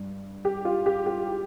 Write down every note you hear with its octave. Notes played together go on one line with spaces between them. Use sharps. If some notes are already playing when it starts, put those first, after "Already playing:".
Already playing: G2
G4
F4
G4
G4